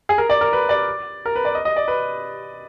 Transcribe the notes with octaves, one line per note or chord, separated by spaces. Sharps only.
G#4
A#4
D5
A#4
B4
D5
A#4
B4
D5
D#5
D#5
D5
B4